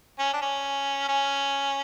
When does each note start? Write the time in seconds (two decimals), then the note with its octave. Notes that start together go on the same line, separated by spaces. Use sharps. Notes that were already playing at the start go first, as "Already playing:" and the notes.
0.19 C#4
0.33 D4
0.42 C#4
1.09 C#4